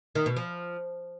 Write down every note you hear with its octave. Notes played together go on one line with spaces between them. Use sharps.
D#3
B2
F3